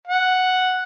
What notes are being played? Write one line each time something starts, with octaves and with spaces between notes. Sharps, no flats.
F#5